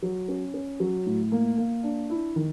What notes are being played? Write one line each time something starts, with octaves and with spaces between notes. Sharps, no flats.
F#3
C#4
C#4
F#3
A2
A#3
A#3
D4
E4
D#3